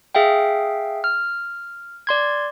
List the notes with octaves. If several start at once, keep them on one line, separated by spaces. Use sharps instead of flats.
G#4 E5 F5 G5
F6
D5 C6 G#6